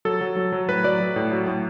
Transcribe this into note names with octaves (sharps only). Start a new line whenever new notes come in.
F#3 A4
F#3
F#3
F#3
A2 B4
F#3 D5
F#3
A2
F#3
A2